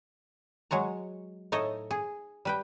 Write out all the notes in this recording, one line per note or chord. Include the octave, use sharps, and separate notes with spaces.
F#3 G#3 C#5 A#5
A2 D#4 A4 C#5 D#5
G#4
G3 B4 G5